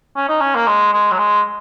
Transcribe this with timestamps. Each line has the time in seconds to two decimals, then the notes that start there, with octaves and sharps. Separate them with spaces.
0.16 C#4
0.28 D#4
0.41 C#4
0.55 A#3
0.67 G#3
0.93 G#3
1.11 F#3
1.18 G#3